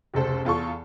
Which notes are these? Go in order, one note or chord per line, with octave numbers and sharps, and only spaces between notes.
F1 C#2 A4 C5
E2 F4 A4 C#6